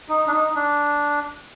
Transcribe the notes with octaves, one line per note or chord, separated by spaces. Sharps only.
D#4
D4
D#4
D4